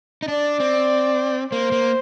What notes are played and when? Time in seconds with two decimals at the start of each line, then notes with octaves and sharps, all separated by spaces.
0.22 D#4
0.28 D4 D5
0.60 C4
1.52 A#3 C5
1.72 A#3